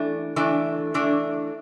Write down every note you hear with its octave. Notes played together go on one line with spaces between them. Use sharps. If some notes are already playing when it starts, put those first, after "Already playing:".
Already playing: E3 A3 D4
E3 A3 D4
E3 A3 D4